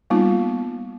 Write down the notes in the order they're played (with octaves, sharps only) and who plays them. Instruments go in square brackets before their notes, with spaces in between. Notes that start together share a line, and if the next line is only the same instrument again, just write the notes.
[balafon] G3 A#3 B3 D#4 F4